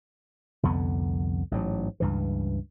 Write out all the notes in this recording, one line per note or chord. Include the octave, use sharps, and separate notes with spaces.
C2 F2 D3 B3
A1 G#2 F#3
C#2 G2 E3